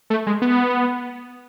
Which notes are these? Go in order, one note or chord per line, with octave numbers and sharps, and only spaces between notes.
A3
G#3
B3